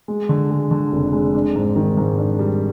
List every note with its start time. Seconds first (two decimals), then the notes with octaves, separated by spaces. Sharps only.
0.08 G#3
0.29 D3
0.51 G#3
0.71 D3
0.92 F1
1.13 G#3
1.35 D4
1.56 G#2
1.76 D#3
1.97 G#2
2.19 D4
2.39 G3